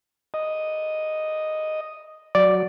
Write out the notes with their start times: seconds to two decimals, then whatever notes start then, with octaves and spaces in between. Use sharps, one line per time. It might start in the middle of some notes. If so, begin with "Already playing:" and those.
0.34 D#5
2.35 F#3 D5